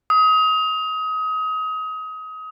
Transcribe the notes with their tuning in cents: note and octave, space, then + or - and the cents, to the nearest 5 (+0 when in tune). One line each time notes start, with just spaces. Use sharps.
D#6 +30